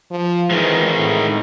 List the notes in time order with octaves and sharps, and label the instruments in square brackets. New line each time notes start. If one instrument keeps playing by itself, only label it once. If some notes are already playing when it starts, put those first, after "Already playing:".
[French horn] F3
[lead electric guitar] G#2 D#3 [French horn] E3
[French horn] A2